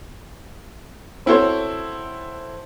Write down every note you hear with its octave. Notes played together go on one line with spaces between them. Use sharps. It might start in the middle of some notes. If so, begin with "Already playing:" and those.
C4 E4 F#4 A4 C5 C#5